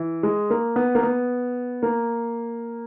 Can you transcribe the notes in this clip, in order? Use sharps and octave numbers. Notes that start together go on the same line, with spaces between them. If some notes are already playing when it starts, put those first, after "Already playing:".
Already playing: E3
G#3
A#3
B3
A#3
B3
A#3